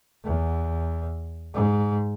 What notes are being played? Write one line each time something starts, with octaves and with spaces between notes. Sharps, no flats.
E2
G#2